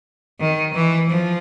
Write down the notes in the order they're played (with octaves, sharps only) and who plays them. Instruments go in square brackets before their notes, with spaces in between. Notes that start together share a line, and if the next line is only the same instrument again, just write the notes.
[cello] D#3
E3
F3